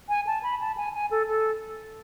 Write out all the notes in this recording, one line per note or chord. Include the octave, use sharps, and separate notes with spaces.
G#5
A5
B5
A5
G#5
G#5
A4
A4